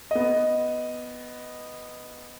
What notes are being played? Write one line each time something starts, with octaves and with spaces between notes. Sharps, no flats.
B3 D#5